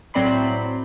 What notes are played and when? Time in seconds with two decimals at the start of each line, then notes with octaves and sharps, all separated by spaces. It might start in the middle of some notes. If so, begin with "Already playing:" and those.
0.14 A2 F#3 C4 D5 B5 C6